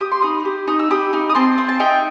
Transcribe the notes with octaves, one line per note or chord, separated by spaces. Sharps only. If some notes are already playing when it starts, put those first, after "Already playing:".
G4 D#6
C6
D#4 B5 D#6
G4
D#4 D#6
E6
G4 B5 D#6
D#4
D#6
C4 A5 C6
C4
A5
D#4 E5 G5